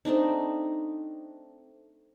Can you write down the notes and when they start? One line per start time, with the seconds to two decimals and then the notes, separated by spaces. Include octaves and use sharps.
0.05 A3 C4 D4 D#4